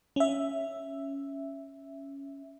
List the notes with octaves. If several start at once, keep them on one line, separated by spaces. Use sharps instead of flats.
C#4 E5